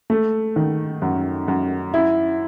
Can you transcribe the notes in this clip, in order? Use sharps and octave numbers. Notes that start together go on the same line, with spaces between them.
A3
D#3
F#2
F#2
E4